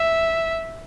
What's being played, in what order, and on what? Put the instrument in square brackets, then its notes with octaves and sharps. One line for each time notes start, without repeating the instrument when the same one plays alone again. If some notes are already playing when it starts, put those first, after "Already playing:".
Already playing: [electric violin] E5